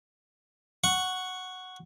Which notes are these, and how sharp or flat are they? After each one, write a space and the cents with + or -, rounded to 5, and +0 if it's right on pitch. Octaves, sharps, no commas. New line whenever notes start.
F#5 +0 C#6 +0